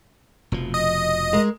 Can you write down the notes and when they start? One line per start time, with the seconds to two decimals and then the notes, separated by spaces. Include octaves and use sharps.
0.52 F1 B2 F3
0.74 D#5
1.33 G#3 A#4